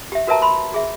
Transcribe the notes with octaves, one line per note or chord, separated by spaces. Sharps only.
G4 E5
F#4 A#4 B4 E5 A5 A#5
B5 C6
F#4 G#4 E5